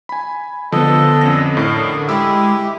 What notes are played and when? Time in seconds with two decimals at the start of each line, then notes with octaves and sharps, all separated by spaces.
0.09 G#5 B5
0.72 D3 F3 B3 A4 D#5
1.21 F2 C#4 A#6
1.57 A2 A#4
2.09 G#3 E4 G4 D6 E6